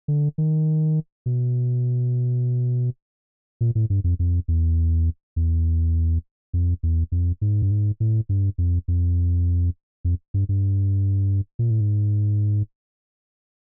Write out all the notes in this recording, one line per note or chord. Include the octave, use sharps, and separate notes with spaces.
D3
D#3
B2
A#2
A2
G2
F2
F2
E2
E2
F2
E2
F2
G#2
G2
G#2
A2
G2
F2
F2
F2
G2
G2
A#2
A2
G#2